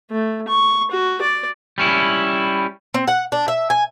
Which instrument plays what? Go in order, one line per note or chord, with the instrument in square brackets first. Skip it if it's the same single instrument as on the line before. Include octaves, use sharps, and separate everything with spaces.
[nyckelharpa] A3
C#6
F#4
D5
[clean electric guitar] G3 C#4 E4
[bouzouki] C4
F#5
D4
E5
G#5